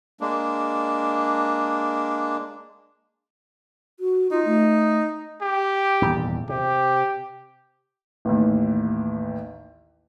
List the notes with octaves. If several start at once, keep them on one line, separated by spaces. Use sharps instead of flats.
G#3 A#3 D4
F#4
D#4 F4
A3
G4
D#1 E2 G#2
C3 G4
A1 D#2